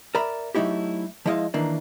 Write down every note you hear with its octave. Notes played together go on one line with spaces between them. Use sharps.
A#4 D5 E5 A#5 B5
F#3 A3 D#4 E4 G4
F3 G#3 E4 D#5 F5
D#3 E3 A#3 D4